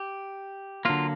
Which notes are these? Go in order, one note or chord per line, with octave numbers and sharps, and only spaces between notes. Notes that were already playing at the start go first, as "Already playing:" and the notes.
Already playing: G4
D3 F#3 A#3 F4